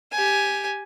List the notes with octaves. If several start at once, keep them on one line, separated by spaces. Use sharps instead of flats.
G4 G#5